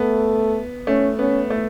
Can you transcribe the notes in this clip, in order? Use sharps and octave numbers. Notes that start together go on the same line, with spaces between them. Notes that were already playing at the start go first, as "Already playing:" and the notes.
Already playing: A3 B3
A3 C#4
B3 C#4
A3